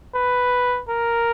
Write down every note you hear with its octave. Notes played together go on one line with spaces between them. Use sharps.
B4
A#4